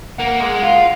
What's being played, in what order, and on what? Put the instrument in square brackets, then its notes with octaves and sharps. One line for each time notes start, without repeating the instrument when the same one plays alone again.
[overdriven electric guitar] A#3 [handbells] F#5
[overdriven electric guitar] G#3
F4